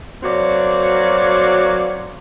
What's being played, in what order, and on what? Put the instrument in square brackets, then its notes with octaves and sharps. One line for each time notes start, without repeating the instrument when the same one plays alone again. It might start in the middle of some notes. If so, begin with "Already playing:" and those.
[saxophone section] F#3 A#3 C4 F#4 C#5 D5